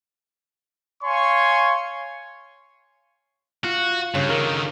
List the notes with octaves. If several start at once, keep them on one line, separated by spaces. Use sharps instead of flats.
C#5 F5 G#5 C6 C#6
F4 F#4
G2 C#3
D3 D#3 A#4